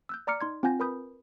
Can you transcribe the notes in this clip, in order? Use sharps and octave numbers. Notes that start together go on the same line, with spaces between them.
E6 F#6 G6
D5 A#5 D6 F6 C#7
D#4 C6 G#6
C4 F4 F#5 G#5 G6 A#6
A#4 B4 B5 D#6 G6